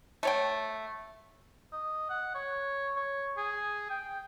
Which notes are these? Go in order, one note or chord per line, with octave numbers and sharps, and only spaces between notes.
A3 C#5 G5
D#5
F#5
C#5
C#5
G#4
G5